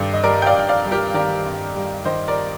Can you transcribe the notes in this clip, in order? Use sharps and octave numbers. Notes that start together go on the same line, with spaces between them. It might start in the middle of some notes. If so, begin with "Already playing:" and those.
Already playing: G2 D#3 G3 A4 D5
D#5
G3 A#4 D5
G5
D5 F5
G2 G5
D5 F5
G3
G4 A#4
D#3 A#4 D5
G2
G3
D#3 C5 D#5
A#4 D5